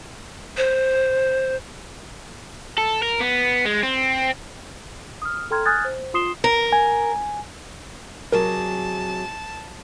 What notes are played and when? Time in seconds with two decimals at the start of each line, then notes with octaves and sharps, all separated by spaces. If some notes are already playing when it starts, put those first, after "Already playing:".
0.57 C5
2.78 A4
3.02 A#4
3.20 B3
3.65 G#3
3.83 C4
5.22 D#6 F6
5.51 A4 G5 A#5 C6 F6 G#6
5.65 G#5 D#6 F6 F#6 G#6 A6
5.85 C5
6.14 F4 C6 D#6 C7 E7 G7
6.44 A#4
6.73 G#5
8.32 C3 F#3 G#4 A#4 A5